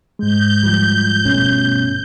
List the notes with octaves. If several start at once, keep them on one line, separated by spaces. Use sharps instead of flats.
G#2 G#3 G6
F3 G3
G1 B2 A3 C#4